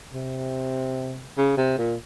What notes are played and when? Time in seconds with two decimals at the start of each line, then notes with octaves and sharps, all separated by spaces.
0.14 C3
1.37 C#3
1.57 C3
1.78 A#2